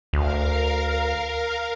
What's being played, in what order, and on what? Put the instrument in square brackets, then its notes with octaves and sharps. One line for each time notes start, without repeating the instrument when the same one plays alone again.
[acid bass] D2 [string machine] A#4 F5